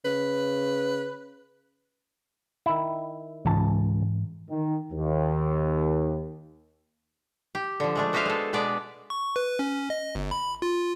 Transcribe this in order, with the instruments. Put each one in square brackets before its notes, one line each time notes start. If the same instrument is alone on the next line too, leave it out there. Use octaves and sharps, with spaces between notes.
[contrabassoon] C#3 [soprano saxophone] B4
[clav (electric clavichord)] D#3 E4
[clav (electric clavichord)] C#2 A5 [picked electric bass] G#2 E3
[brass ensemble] D#3
D#2
[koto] G4
D3 F3
G#3 A3 D4
B3 F#4 B4 C5 E5 F5
G#3 A4
B2 G#3 B3 D4 B4 D5
[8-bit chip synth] C#6
B4
C#4
D#5
G1
B5
F4